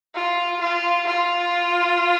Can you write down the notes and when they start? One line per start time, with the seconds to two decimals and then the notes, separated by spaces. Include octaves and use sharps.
0.15 F4
0.60 F4
1.06 F4